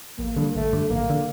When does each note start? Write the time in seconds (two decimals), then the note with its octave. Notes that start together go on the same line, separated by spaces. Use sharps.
0.18 A1 A#3
0.36 G2 D3
0.55 A1 A3
0.72 G2 D3
0.90 A1 A#3
1.09 D3